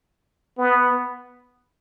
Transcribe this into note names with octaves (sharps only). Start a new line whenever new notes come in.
B3